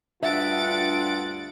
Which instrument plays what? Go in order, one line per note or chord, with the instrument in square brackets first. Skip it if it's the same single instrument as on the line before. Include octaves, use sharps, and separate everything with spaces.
[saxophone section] D2 G2 F#5 [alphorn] F4 [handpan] E5 [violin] A6 D7